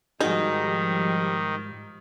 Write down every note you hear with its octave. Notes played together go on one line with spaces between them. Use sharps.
G#2 D#3 F3 G3 D#4 F#4 G#4